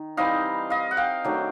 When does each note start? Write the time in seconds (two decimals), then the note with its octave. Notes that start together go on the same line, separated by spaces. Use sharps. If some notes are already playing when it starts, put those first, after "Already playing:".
Already playing: D#3
0.17 E3 G3 C4 D#4 D#5 F5
0.70 D#5 F5
0.91 F#5
0.97 F5 G5
1.24 D#3 F#3 A3 D4